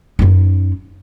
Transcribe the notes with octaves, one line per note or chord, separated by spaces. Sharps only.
F#2 D#4